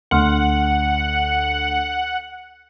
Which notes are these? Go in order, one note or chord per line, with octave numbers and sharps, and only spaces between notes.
D2 F#5 C6 F6